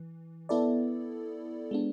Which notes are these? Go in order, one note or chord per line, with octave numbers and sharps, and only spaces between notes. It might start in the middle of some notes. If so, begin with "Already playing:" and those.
Already playing: E3
B3 E4 A4 D5
G#3 B3 D4